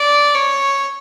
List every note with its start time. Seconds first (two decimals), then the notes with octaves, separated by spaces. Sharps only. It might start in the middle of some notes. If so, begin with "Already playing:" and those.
Already playing: D5
0.35 C#5